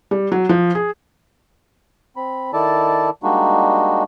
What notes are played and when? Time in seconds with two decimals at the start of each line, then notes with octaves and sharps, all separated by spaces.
0.11 G3
0.32 F#3
0.49 F3
0.75 G#4
2.16 C4 B5
2.53 D#3 E4 A4 D5 A5
3.23 G3 G#3 A#3 D4 D#4 F#4